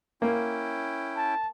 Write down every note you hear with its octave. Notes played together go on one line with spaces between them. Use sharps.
A#3 C#4 E4 G5
A5